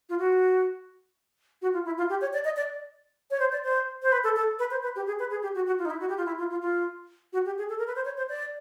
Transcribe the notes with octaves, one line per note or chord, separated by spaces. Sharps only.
F4
F#4
F#4
F4
E4
F4
G4
C#5
D5
D#5
D5
C#5
C5
D5
C5
C5
B4
A4
A4
B4
C5
B4
G4
G#4
B4
G#4
G4
F#4
F#4
F4
D#4
E4
F#4
G4
F4
E4
F4
F4
F4
F#4
G4
G#4
A4
A#4
B4
C5
C#5
C5
D5